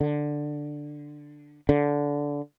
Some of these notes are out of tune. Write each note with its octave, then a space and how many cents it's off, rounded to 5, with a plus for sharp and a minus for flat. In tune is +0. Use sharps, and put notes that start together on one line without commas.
D3 +5
D3 -15